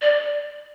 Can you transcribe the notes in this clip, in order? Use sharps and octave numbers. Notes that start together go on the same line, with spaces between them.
D5